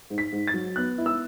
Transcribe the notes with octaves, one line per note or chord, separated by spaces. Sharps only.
G#2
B6
G#2
A6
F#3
B3 F#6
E4
E6